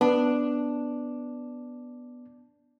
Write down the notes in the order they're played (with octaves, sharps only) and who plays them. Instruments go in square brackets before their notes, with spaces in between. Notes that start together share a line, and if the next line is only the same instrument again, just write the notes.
[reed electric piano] B3 [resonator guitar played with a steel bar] D4